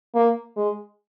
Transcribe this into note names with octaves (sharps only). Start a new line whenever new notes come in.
A#3
G#3